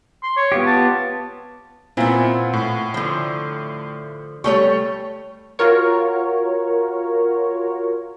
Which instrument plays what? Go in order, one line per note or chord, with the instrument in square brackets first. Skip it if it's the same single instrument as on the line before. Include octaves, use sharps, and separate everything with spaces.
[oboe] C6
C#5
[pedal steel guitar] B3 F4 G4
[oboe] A5
[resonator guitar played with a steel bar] A#2 B3 [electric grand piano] C4 E4 F4
[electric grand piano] A2
[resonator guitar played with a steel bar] D3 F3
[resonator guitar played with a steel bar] G3 A3 C#5 [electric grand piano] C#6
[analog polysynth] F4 F#4 A#4 C#5